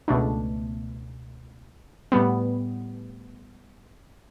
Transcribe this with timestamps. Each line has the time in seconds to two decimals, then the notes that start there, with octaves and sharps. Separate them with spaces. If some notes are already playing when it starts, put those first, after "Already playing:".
0.08 C#2 B2 A3 D4
2.12 A2 G3 B3